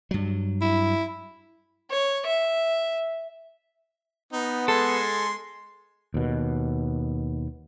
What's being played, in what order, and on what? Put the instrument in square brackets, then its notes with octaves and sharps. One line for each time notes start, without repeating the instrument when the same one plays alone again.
[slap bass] G2 F#3
[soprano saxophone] E4
[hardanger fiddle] C#5
E5
[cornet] B3 [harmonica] D#4
[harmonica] G#3 G#5 C6 [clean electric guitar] A4
[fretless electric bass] D#2 B2